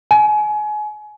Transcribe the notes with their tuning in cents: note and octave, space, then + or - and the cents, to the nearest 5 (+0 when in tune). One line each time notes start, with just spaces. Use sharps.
G#5 +30